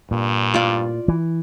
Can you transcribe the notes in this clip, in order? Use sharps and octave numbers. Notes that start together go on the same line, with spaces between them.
G2 A#2
F4 D5
E3